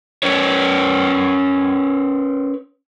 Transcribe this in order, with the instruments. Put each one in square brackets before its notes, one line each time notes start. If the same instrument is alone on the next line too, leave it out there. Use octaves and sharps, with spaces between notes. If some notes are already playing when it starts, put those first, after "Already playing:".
[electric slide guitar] C#4 A#4 B4 C#5